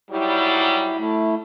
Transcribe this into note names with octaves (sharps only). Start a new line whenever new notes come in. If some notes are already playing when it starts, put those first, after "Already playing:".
G#2 F#3 G3 E4
A3 E4